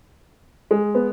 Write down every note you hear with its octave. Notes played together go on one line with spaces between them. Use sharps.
G#3
B3